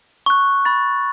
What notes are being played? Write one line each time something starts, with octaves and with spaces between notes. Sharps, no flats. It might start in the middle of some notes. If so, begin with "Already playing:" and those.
C#6 F#6
B5 A6